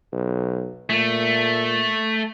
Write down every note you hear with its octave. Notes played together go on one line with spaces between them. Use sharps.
B1
A#2 A3